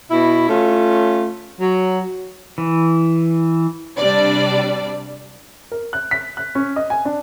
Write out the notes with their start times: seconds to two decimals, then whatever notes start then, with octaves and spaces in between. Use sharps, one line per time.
0.10 B2 E4
0.49 A3 C#4 F4
1.60 F#3
2.58 E3
3.99 C3 G3 D4 D5
5.72 A#4
5.93 F#6
6.11 B6
6.37 F#6
6.55 C#4
6.76 D#5
6.90 G#5
7.05 D4